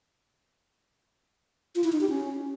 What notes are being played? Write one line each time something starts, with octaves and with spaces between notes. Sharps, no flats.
F4
E4
D#4
G4
C#4